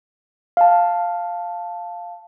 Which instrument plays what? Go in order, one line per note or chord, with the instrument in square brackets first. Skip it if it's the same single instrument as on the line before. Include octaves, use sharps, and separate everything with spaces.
[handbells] F5 A5